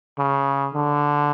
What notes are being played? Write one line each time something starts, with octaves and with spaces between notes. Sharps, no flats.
C#3
D3